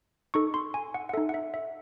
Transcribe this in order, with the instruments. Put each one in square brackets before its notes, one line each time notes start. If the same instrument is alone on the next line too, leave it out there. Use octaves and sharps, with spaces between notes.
[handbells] D#4 A4 C#6
C6
G#5
F#5
F#5
A4 E5
D#4
F#5
E5
E5